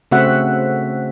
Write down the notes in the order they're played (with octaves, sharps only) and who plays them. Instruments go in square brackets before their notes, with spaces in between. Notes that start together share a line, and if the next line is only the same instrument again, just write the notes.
[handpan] C#3 A3 C4 F#4 E5 F#5